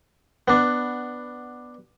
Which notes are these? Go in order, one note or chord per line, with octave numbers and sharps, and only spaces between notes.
B3 D4